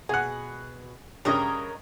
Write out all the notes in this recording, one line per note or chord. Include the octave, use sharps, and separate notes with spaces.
B2 G#4 F#5
G2 C#3 A#4 C#5 D#5